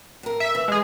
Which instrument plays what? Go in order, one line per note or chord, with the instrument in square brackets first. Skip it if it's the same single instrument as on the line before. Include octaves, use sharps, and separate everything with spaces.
[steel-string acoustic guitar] A2 A#4
[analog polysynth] E5
[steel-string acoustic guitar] E3
[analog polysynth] G#3 G#4